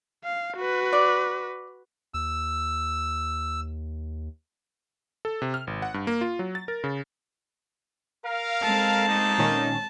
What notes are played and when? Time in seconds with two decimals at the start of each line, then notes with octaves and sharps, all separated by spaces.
0.24 F5
0.57 F#4 B4
0.93 D5
2.14 D#2 E6
5.25 A4
5.42 C3
5.54 F6
5.67 G#1
5.82 F#5
5.94 G2
6.07 A#3
6.21 F4
6.39 F#3
6.55 A6
6.68 A#4
6.84 C#3
8.24 A#4 F5
8.62 G#3 C4 A4 A5
9.07 A3 A#3 D#4
9.38 A#2 D#3 C#4